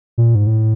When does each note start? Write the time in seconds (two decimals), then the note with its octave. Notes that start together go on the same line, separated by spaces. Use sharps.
0.18 A#2
0.35 G#2
0.47 A2